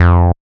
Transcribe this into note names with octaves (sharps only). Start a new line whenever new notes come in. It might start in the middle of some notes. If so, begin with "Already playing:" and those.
Already playing: F2